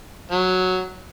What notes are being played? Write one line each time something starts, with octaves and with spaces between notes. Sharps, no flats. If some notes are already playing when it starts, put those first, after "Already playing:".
F#3